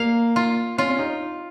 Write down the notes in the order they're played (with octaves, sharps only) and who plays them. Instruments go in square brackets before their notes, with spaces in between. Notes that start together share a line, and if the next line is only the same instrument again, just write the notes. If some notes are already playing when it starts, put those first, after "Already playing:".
Already playing: [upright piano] A#3 [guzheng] F5
[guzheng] F4
[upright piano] C#4 [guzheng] F4
[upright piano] C#4
D#4